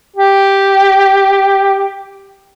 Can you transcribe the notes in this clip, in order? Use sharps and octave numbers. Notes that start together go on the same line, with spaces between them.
G4